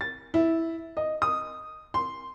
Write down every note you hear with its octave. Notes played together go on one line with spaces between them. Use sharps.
A6
E4
D#5
D#6
C6